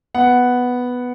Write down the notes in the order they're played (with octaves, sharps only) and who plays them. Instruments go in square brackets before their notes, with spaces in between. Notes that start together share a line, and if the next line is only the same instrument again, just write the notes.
[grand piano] B3 F#5